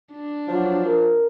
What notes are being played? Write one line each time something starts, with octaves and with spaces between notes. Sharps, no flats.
D4
F3 F#3
A#4